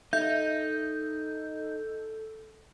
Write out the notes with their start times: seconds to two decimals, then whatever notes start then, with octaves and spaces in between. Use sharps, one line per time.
0.13 D#4 A4 E5 G6